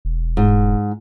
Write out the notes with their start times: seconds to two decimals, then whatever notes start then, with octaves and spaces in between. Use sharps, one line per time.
0.05 E1
0.37 G#2